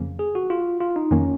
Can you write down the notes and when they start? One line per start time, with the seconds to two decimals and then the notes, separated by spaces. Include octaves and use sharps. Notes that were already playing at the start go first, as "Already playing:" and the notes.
Already playing: F2 C#3 F3 A#3 C#4
0.19 G#4
0.35 F#4
0.50 F4
0.80 F4
0.96 D#4
1.11 F2 D#3 A#3 C#4